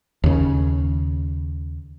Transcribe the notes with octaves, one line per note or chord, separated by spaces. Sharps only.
D#2 C#3